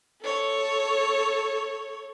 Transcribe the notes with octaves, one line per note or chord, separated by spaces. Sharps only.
A4 C#5